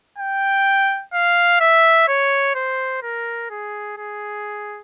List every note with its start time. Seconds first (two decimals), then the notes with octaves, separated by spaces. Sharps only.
0.19 G5
1.13 F5
1.60 E5
2.08 C#5
2.55 C5
3.03 A#4
3.50 G#4
3.97 G#4